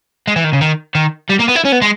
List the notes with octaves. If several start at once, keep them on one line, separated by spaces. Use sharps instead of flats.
G#3
E3
D#3
C#3
D#3
D#3
G3
A#3
B3
E4
C#4
B3
G#3